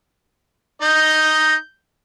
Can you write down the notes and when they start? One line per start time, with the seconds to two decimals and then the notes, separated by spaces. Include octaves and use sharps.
0.81 D#4 D#5 G6